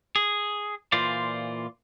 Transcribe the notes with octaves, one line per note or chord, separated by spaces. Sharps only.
G#4
A#2 E3 F4 C5 D5